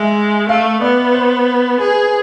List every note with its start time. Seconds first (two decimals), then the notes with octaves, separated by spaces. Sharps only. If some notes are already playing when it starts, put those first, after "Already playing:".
Already playing: G#3 E5
0.49 A3 F5
0.81 B3 D5
1.14 C5
1.79 G#4 B4